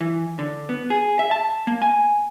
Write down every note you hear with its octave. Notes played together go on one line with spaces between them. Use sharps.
E3
D3
B3
G#4
E5
A5
A#3
G#5